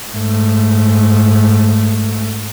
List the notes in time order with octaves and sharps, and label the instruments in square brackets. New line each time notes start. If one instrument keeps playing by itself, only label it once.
[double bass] G#2 A3